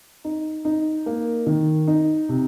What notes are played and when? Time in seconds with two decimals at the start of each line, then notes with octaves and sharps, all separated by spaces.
0.24 D#4
0.65 D#4
1.06 A#3
1.47 D#3
1.87 D#4
2.29 C3